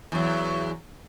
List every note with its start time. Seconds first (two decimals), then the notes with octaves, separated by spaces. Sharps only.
0.12 E2 F#3